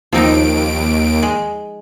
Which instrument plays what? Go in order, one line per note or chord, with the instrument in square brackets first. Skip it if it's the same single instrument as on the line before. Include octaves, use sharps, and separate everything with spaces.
[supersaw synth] D#2 D7 [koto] F3 C4 D#4
[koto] G#3